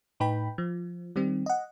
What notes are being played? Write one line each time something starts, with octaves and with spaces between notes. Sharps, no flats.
A2 D#4 B4 G5 B5
F3
D#3 G3 C4
D#5 F#5